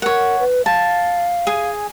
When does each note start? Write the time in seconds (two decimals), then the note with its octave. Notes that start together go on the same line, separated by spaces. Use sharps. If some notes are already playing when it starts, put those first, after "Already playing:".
0.02 A#4 C#5 F#5
0.39 B4
0.66 F5 A5
1.47 G#4 G#5